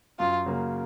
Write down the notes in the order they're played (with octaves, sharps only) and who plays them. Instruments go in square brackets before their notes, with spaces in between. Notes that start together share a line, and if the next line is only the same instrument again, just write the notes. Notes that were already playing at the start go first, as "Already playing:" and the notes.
[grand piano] F#2 [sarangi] F4
[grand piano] C#3 F#3 A#3